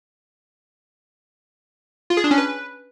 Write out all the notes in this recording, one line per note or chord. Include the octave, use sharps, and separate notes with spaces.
F4
G#4
D4
C#4
B4